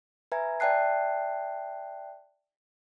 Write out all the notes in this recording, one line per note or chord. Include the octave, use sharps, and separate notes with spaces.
B4 E5 G#5 A#5 G#6
D5 E5 G5 A5 F#6 C7